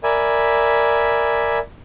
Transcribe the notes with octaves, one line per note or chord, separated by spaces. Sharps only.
A#4 D5 E5 G#5 B5